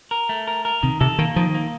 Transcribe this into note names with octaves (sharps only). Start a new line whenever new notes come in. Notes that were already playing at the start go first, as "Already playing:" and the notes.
A#4
A3
A#4
A#4
C3 D#3
C3 A4
D#3 A#3
D#3 F3
A#3